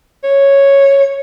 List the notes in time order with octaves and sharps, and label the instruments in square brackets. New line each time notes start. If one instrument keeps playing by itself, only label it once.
[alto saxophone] C#5